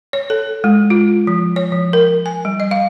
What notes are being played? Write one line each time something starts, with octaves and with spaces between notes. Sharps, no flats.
C#5
A4
G#3
F4
F3
C#5
F3
A#4
G#5
G3
D#5
F5